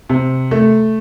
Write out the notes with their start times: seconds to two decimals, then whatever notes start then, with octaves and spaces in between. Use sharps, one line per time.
0.09 C3
0.51 A3